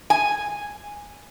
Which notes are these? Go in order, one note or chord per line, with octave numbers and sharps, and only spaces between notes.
G#5